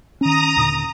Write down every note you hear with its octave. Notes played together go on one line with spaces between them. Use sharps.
D#3 C#4 A#5 D#6
D#2 A#2 D3